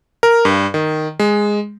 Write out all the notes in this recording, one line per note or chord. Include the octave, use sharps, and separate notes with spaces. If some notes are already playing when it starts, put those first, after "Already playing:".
A#4
G2
D#3
G#3